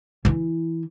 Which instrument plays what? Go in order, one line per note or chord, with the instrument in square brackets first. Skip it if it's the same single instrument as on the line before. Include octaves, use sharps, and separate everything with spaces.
[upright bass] E3 E4